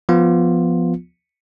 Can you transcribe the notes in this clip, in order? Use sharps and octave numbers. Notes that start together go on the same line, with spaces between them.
F3 B3 F4